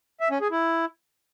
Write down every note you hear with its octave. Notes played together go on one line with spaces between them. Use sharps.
E5
C#4
G#4
E4